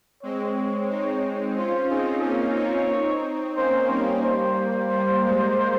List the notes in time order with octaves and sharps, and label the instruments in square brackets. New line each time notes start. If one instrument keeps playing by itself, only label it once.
[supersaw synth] G#3 C4 [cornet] C#5
[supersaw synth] C4 D#4
[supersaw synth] C#4 F4 [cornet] C5
[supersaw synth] C4 D#4 [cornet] G#4
[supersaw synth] A#3 C#4 [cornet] C#5
[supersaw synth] C4 D#4
[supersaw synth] A#3 C#4 [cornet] C5
[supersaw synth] G3 A#3 [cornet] C#5
[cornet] C5
[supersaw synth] G3
G#3